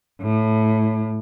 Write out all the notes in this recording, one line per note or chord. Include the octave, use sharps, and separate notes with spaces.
A2